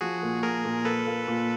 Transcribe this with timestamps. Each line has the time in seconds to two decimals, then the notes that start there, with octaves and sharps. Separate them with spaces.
0.01 F3 F#4 G#4
0.23 A#2
0.43 A#2 G#4 A#4
0.64 A#2
0.85 A#3 A4 B4
1.07 A#3
1.28 A#2